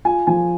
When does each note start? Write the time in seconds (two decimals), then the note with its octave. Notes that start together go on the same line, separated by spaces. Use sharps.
0.05 F4 G#5
0.27 F3 G#5